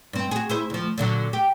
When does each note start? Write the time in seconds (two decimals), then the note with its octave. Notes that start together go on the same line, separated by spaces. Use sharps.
0.13 G2 C4
0.31 F#4 G#4
0.49 E4 G#4 C5
0.70 D2 F3
0.98 A#2 D3 F#3
1.33 G4